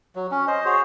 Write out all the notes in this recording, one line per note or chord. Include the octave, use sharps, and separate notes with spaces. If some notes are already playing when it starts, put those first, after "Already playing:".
F#3
C#4
C5 D#5
F#4 G#4 C5 C#5